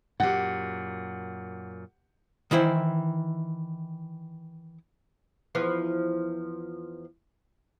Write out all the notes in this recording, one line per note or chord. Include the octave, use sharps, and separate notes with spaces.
F#2 A#2 G4 F#5
D#3 E3 E4 C5
E2 F3 B4